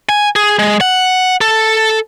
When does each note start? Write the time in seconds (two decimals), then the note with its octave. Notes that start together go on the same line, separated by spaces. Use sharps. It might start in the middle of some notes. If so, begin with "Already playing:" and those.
0.09 G#5
0.36 G#4
0.59 G#3
0.81 F#5
1.41 A4